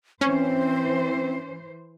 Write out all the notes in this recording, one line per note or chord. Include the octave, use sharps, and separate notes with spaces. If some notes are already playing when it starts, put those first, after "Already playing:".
E3 C4 C#4 C5